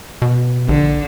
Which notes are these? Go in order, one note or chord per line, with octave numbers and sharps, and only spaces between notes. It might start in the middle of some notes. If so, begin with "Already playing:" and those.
B2
A#1 D3